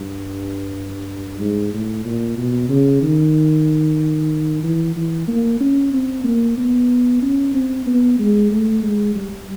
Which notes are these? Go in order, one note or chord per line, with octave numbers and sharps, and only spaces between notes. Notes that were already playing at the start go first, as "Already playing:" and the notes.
Already playing: G2
G#2
A2
A#2
B2
C#3
D#3
E3
E3
A#3
C#4
C4
A#3
B3
C#4
C4
B3
G#3
A3
G#3
G3